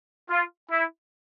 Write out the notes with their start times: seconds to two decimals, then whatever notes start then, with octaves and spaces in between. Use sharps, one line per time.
0.29 F4
0.70 E4